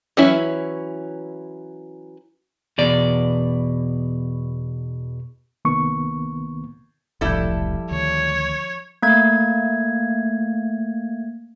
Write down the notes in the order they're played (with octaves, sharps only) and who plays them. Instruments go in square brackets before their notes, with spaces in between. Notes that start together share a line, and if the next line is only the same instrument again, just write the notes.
[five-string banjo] E3 F#3 C#4 E4
[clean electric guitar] E2 B2 D5
[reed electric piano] C2 D#3 A#3 B3 C#6
[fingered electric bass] E1 C2 A2 [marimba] F3 G6 [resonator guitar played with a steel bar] G3 E4 A4
[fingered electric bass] D2 D#3 [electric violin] C#5
[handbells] A3 A#3 G#6